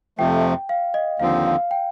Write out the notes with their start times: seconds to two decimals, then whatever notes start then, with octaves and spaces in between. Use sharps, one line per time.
0.18 F2 C3 F3 A3 G5
0.69 F5
0.94 D#5
1.19 D#2 D3 F3 C4 F5
1.46 F5
1.71 G5